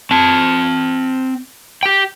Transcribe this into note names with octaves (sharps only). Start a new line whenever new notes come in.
C4 A5
G4 G5